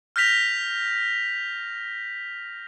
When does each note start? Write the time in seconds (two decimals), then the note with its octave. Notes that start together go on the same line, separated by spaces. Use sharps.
0.16 F6 G6 A#6 B6 F7